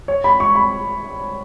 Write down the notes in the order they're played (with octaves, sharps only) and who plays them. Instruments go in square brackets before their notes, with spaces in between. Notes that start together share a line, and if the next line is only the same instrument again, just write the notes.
[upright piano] C#5
B5
C#6
B5